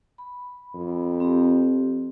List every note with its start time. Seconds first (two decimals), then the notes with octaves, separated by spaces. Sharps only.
0.18 B5
0.75 F2
1.20 C4 G4